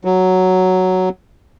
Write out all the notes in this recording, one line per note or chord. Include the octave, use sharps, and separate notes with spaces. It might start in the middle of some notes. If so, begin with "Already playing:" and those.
F#3